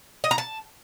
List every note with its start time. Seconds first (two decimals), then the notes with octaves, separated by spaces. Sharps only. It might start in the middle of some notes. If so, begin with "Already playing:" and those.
0.24 D#5
0.31 A#5
0.38 A5